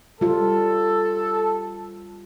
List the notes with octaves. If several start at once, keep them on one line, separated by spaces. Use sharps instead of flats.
G3 F4 A4